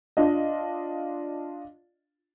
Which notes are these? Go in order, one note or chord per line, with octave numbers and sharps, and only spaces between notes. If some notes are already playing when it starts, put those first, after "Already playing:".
D4 F4 D#5